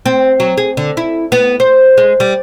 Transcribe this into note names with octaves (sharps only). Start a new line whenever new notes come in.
C4
F#3
G#4
D3
E4
B3
C5
G#3
G3